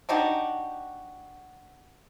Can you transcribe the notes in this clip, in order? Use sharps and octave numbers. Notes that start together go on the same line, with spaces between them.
D4 D#4 F#4 G4